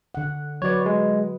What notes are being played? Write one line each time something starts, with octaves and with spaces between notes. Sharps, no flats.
D3 F#5
F#3 F#4 B4 C#5 D5
G#3 B4